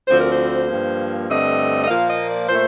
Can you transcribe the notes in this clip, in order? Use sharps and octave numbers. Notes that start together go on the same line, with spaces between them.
D2 D3 F3 C4 C5
A#4
C5
G2 F3 A#3
G2 D3 A3 C4 D#5
D#5
A#2 F3 A#3 F5
D#5
D5
A#2 A3 C5